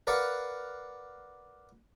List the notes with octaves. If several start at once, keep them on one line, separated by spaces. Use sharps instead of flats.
A#4 B4 D5 F5 F#5